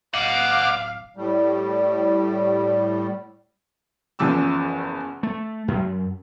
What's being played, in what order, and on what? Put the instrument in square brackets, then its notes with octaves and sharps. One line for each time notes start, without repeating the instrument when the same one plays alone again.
[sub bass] D1 [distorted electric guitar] D#5 F#5 [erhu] F5 [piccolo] D6
[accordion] A2 G3
[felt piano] F#1 E2 C#3 F3 D6 E6
[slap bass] A3
F#2